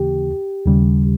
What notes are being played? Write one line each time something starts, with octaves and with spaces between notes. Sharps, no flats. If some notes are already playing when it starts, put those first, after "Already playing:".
Already playing: D#2 C#3 E3 A#3 G4
D#2 C#3 G3